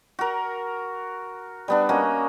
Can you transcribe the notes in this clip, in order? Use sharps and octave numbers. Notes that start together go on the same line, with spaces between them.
F#4 A#4
G3 B3 D4
A#3 C#4 F#4 D#5